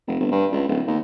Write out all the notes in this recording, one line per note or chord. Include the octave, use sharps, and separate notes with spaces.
F1
G1
G2
C#2
D1
D#2